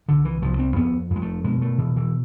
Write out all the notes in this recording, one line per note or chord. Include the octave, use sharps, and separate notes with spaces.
C2 D3
E3
C2 F3
C4
F2 B3
F2
G#3
A3
B2 G#3
A3
B2 E3
E3